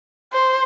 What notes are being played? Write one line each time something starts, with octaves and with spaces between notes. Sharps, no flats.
C5